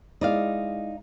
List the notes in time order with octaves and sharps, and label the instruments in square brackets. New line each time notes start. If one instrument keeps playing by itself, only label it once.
[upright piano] G#3 E4 [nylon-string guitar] D#4 D5 F5